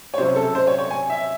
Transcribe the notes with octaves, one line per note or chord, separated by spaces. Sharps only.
C#5
C3 F#3 C#4 C5
A4
C5
C#5
C#5
G#5
E5